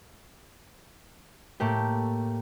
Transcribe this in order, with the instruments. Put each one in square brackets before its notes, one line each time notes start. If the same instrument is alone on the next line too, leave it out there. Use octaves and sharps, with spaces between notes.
[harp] A2 A3 A#3 G4